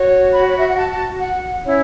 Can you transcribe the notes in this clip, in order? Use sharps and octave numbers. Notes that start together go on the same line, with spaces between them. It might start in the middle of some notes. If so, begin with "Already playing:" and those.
Already playing: F#4 C#5
B5
C#5
E5
F#5
A5
F#5
C#4 E4 C#5